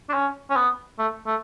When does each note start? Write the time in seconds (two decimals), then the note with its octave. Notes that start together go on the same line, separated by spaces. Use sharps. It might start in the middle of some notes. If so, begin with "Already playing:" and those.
0.09 D4
0.14 C#4
0.50 C#4
0.56 B3
0.99 A3
1.27 A3